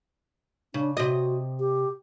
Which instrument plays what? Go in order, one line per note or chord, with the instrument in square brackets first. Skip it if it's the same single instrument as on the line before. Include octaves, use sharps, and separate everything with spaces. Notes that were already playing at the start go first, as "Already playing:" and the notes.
[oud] C#3 [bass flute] D4
[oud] C3 D#5 [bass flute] F#4
[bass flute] G4